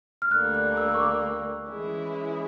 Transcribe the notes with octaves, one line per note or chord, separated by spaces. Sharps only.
F6
D2 D3 G3 A#3 F#6
F#6
E6
C#6
D6
E3 G#3 C#4 E4